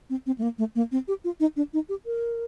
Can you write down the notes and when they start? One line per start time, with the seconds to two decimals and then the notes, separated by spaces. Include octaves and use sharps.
0.10 C4
0.26 C4
0.38 A3
0.42 A#3
0.58 A3
0.75 A#3
0.92 C4
1.08 G4
1.24 F4
1.40 D#4
1.56 D4
1.73 D#4
1.89 G4
2.06 A#4